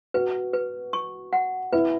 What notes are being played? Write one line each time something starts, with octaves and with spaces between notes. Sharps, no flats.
F#4 B4
B4
C#6
F#5
E4 B4